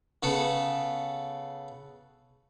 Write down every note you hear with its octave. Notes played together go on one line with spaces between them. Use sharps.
C#3 B3 A4